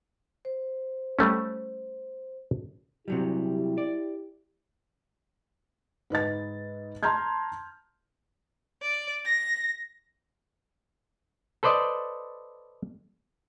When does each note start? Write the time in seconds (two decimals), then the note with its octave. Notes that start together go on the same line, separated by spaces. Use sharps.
0.45 C5
1.19 G3 A3 C#4
3.08 C3 F#3 G3 E4 G4
3.78 D5
6.10 G#2 B4 D#5 A6
7.03 A5 A#5 C6 F6 G6 G#6
8.82 D5
9.25 A#6
11.63 A4 B4 C5 D5 D#5